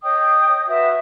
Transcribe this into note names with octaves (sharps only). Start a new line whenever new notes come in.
C#5 D#5 G5 D#6
F#4 B4 E5 D#6